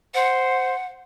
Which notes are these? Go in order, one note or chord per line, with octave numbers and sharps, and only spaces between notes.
C5 F#5